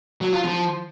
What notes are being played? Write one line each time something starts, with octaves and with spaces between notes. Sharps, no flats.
F#3
F4
F3